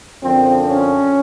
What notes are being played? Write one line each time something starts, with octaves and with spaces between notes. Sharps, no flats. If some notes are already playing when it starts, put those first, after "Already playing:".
F#2 D3 F3 C4
C#4